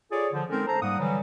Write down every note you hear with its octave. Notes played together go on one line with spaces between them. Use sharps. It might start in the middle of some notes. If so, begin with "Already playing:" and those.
F4 G#4 A4 C#5 D5
D3 F3
G#3 C4 C#4 D#4 A4 A#4
A4 C5 A#5
G#2 G3 A#3 F#5 D#6
D3 E3 F#3 G3